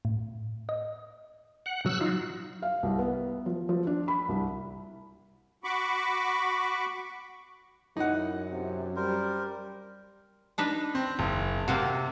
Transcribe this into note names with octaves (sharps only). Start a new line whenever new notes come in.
A2
D#5
F#5
F#3 E6 F#6
D#4 F4
F5
C2
B3
F3
F3
D4
B5
C2
F#4 B5 C#6 D6
F#2 D#4 E4 F#5
C3
G3 A#4 C5
D4 D#4 B4
C4
F#1
C3 A#3 C4 F#4